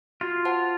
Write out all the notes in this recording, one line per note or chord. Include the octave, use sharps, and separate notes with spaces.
F4 F#4
C5 F#5 A5